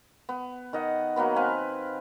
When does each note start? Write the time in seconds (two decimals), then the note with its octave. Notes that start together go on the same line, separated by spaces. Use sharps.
0.29 B3
0.73 D#3 D#5 F#5
1.16 F#3 A#3 B3 B4
1.36 C4 B4 F5 G#5